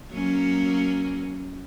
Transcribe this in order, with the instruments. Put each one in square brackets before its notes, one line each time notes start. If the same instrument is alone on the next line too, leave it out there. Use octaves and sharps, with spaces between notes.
[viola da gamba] F#3 A#3 C#4